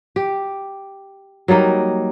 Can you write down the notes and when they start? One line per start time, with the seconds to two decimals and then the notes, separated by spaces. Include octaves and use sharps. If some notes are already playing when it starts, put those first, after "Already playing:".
0.16 G4
1.48 F#3 G3 A#3 D#4